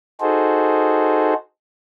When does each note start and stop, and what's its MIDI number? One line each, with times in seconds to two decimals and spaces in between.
0.21 1.34 63
0.21 1.34 66
0.21 1.34 68
0.21 1.34 69
0.21 1.34 72